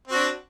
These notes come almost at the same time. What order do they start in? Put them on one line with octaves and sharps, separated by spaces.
C4 F#4 D4